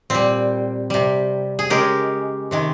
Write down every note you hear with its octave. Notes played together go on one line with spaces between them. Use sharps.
A#2 G3 C4
C3 G3
G#4
C#3 G#3 G4 A#4
C3 D#3 G#3